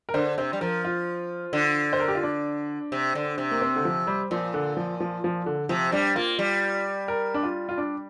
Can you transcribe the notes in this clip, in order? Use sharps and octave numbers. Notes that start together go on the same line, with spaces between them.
A#4
D3 C5
C3 C5
G3
F3 A#4
F4
D3
C5
A#4
G4
F4
D4
C3
D3
C3
A#3
C4
D3
F3
G3
A#2 F3
D3
F3
F3
F3
D3
C3 F3
G3 D4
A#3 F4
G3
A#4
D4
F4
F4
D4